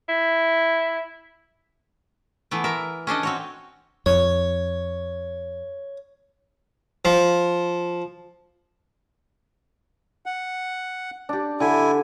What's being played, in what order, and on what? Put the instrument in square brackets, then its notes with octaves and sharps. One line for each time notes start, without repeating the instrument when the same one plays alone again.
[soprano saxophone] E4
[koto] E3 A3 B3
A#4 E5
C#4 D4 A4 D#5
C4 F#4 C#5
[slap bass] F2 [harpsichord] C#5
[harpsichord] F3
[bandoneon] F#5
[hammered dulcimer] D4 G4
[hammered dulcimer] D3 [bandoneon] E4 G#5